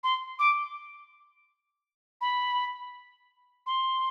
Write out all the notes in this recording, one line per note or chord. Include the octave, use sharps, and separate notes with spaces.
C6
D6
B5
C6